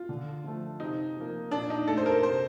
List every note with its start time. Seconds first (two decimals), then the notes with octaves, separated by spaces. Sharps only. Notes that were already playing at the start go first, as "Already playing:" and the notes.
Already playing: F4
0.09 D3
0.44 F3 A3
0.80 C3 D#4
1.16 F3 A#3
1.51 A#2 D4
1.70 D#4
1.87 A3 A4
1.97 C5
2.06 A#4
2.23 C3 C5